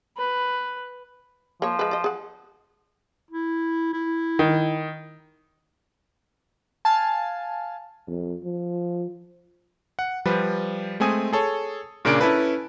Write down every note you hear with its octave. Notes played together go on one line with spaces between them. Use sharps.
B4
F3 A#3 C#5
G#3 B4
D5 D#5
G#4 F#5
E4
E4
D#3
F5 G#5 A5
F2
F3
F#5
F3 G3 B4
G#3 A3 C4 G#5 D#6
G#4 A4 C#5
A#2 C#3 A#3 D4 D7
C#4 E4 A4 B4